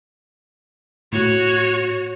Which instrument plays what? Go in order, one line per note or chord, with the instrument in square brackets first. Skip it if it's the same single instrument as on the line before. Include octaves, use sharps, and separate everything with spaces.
[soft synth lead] A2 [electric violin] F#4 C#5